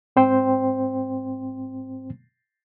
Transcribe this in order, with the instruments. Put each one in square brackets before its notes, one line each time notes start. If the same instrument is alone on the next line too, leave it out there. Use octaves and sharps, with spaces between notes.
[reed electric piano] G#2 C4 C5 G5 C6